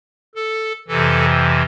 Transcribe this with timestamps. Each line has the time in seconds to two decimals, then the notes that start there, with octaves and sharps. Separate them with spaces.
0.35 A4
0.88 F2 C3 E3 A4